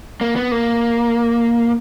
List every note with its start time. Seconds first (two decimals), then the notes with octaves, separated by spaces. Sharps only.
0.21 A#3
0.36 B3
0.52 A#3